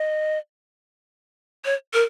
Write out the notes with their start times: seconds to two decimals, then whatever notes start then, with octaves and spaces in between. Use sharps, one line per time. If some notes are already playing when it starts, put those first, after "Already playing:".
Already playing: D#5
1.65 C#5
1.94 A#4